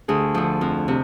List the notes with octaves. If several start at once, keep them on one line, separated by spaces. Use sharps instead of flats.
D2 G#4
D3 F3
F2
C3